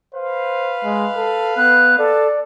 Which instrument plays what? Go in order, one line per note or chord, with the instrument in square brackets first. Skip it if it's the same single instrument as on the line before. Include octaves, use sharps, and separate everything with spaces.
[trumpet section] B4 F5 [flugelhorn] C5
[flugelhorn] G#3
A4
[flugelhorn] B3 [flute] F#6
[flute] A4 [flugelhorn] D5